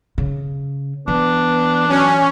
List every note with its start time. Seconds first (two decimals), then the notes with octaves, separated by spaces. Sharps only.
0.18 C#3
1.08 E3 B3 D4
1.89 F#3 C#4